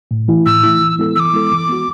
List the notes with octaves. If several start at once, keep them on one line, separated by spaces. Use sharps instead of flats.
A2
E3 A3 E4
A2 E6
E3 A3 E4
E3
G#3 B3 E4 A4
E3 D6 E6
G#3 B3 E4 A4
E3
B3 F#4